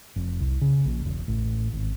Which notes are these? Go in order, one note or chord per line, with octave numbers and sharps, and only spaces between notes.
F1
C2
C#3
A#1
E1
A1
G#1